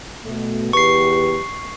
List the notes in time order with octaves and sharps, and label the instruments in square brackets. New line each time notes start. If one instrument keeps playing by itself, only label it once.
[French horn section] B2 A3
[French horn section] E2 G4 B4 [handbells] C#6 C7